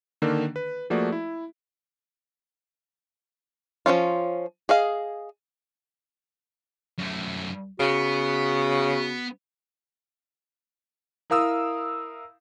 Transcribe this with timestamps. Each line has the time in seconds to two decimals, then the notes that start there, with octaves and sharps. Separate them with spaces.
0.22 D3 D#3 A#3 D4
0.56 B4
0.90 F3 A3 A#3 F#4 G#4 D5
1.12 E4
3.86 F3 F#3 C#4 F4
4.69 G#4 D#5 F5
6.99 F#2 A3
7.80 C#3 B3 F#4
11.30 E4 A#4 F5 D#6 E6